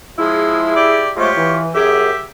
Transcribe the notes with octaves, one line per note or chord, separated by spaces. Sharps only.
F3 G#3 E4 G#4
G4 D5
F3 G#3 A3 F4 G4 C#5
E3
F#2 G4 G#4 E5 D6